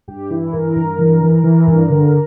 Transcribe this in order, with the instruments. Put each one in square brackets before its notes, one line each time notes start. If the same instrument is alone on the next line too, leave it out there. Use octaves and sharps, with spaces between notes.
[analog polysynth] G2 G4
E3 E4
G2 A#4
G2
E3
E3
E3
G2
D3